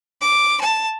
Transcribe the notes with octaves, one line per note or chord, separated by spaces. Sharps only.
D6
A5